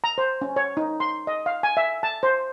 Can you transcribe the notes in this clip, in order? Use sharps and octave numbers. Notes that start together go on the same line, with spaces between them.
A#5
C5
C#4
C#5
D#4
C6
D#5
F5
G#5
E5
A5
C5